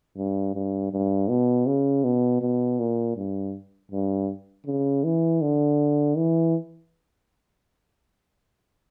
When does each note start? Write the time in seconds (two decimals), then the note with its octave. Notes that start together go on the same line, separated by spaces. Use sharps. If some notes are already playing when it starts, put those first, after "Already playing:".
0.17 G2
0.54 G2
0.92 G2
1.29 B2
1.66 C#3
2.04 B2
2.41 B2
2.79 A#2
3.16 G2
3.91 G2
4.66 C#3
5.04 E3
5.41 D3
6.17 E3